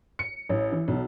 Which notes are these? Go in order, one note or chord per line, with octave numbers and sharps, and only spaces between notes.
C#7
A1
E3
B1